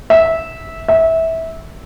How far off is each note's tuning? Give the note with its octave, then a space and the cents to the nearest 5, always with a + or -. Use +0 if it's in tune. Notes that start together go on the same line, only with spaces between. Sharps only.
E5 -15
E5 -20